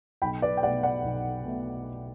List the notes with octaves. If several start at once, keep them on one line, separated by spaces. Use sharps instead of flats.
B1 G5 B5
B4 D5
G5
B2 A3 D5 F#5
D5 F#5
B1
B2 A3